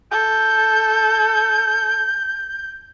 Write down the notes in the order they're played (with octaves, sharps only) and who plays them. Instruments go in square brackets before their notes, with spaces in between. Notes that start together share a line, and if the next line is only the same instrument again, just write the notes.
[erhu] A4 [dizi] G6